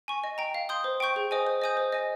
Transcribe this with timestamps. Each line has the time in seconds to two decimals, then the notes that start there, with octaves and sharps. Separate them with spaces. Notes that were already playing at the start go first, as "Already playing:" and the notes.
0.08 G#5 C#6
0.24 D#5
0.38 G5 A#5
0.54 F5
0.69 C6 D#6 G6
0.84 C5
1.00 G5 C#6 G6
1.16 G#4
1.31 C5 D#5 G#5 D#6
1.47 C5
1.62 D#5 G#5 D#6 G6
1.77 C5
1.92 D#5 G#5